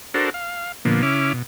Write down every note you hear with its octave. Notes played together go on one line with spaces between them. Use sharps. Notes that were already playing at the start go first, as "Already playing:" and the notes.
D4 F#4 A4 A#4 C5
F5
A#2 D3 F3 A#3 B3
C#3 C#4 E4 D6 F6
B2